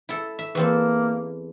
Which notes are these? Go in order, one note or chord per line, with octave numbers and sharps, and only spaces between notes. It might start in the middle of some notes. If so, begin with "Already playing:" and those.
E4 A4
E5
E2 A#3 C4 A4